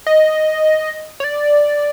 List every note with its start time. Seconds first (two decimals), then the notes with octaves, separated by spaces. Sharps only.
0.07 D#5
1.20 C#5
1.24 D5